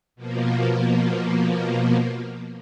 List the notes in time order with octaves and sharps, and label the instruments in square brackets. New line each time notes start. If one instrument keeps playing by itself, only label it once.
[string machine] B2 F3 A#3